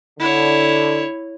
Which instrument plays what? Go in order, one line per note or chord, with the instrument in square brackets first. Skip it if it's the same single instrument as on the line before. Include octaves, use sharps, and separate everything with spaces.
[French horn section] D3 [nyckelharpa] E4 C#5